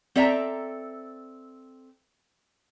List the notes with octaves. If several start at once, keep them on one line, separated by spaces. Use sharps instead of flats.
C4 A4 D5 E5 G5 A#5